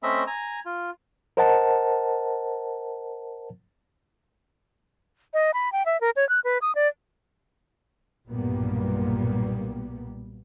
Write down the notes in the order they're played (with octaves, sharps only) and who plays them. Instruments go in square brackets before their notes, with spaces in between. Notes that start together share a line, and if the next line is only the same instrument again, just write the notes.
[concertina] A3 C4 C#4 D#5 E5 B5
G#5 A#5
F4
[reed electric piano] A#4 C5 D#5 F#5 A5
[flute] D#5
B5
G5
E5
A#4
C#5
F#6
B4
D#6
D5
[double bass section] B1 G2 A#2 G3 A#3 B3